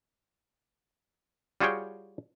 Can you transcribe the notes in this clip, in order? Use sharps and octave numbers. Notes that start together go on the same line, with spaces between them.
G3 F4 F#4 G#4 C#5 G5